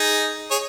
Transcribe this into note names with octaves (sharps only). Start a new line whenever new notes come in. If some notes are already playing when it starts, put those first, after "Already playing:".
Already playing: D#4 G#4
G#4 C#5